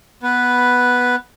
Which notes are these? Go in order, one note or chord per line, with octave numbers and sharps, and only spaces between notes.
B3 B4